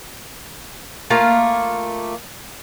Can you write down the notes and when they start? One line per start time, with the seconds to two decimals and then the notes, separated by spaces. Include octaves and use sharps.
1.10 A3 A#3 F4